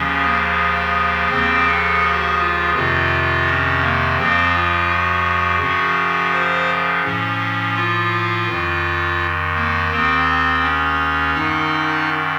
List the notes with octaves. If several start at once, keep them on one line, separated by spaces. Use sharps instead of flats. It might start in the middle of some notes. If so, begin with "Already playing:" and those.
Already playing: D#2 C#3 F3 C#4
A#3
D#2 C#3 F3 C4
A4
F#4
F4
F2 C3 D#3 F4
C#4
A#3
F2 C#3 F3 C4
F4
F#4
F#2 C#3 F3
C5
A2 F3 C#4
F4
F2 D#3
A#3
D#2 D#3 C4
C#4
F#2 D#3 D#4